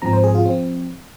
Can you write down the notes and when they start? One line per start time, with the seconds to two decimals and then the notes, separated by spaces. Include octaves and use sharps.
0.02 G#2 F3 C4 A#5
0.13 C5
0.24 G#4
0.35 F4
0.45 F3 C4